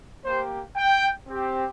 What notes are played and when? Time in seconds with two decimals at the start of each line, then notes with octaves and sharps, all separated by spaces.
0.23 A#3 G4 C5
0.76 G5
1.28 C4 G4